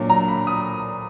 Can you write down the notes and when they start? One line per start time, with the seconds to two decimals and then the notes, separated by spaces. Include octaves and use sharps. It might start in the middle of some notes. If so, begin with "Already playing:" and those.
Already playing: A#2 F#3 D4
0.10 A#5
0.28 B5
0.47 D#6